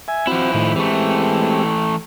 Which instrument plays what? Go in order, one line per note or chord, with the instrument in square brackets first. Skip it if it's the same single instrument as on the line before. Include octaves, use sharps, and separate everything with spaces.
[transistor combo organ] E5 G#5
[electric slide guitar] F3 E4 [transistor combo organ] C4 F#4
[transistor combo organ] A2 D#3
[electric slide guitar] E3 A3 [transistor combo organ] G#3 C4 G4